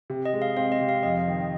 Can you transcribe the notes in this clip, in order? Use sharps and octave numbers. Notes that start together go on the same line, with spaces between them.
C3
D#5
G#3
F5
C4 F5
D#5
C3
F5
F2 D#5
D#3